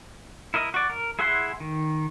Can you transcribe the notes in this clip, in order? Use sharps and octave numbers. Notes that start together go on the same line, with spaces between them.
E4 A#4 D#5
F#4 D5
A#4
E4 G#4 E5 F#5 C6
D#3